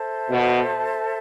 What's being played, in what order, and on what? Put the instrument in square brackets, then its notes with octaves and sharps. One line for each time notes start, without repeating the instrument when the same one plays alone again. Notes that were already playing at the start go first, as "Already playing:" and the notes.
Already playing: [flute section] A4 C5 E5 A5
[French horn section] B2